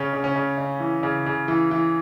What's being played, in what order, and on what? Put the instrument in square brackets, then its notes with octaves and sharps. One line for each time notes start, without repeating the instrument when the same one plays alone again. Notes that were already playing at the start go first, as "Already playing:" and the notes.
Already playing: [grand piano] C#3 C#4
C#3
C#4
C#3
C#3
E3
C#3
C#3
E3
E3